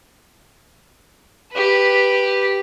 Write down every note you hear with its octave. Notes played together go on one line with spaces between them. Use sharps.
G4 B4